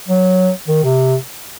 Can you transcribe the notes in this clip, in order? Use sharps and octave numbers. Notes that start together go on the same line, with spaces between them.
F#3
D#3
C3